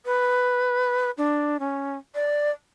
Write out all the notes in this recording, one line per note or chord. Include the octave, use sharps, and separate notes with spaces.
B4
D4
C#4
D5